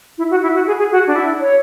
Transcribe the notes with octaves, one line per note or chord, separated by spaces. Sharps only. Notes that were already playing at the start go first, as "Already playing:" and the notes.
E4
F#4
E4
F#4
G#4
G#4
F#4
D4
E4
C#5